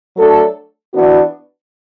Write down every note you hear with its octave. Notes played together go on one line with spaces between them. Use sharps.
F#3 A3 D4 A4
E3 B3 D4 F#4